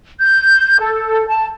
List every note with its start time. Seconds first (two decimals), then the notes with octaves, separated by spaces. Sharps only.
0.21 G6
0.80 A4
1.28 A5